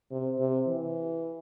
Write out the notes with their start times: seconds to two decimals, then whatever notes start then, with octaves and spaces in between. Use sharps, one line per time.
0.11 C3
0.39 C3
0.67 E3